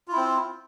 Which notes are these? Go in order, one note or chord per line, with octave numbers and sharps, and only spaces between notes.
C4 E4 F4